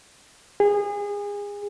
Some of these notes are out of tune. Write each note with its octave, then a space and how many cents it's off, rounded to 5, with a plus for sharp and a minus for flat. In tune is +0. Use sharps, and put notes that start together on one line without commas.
G#4 -30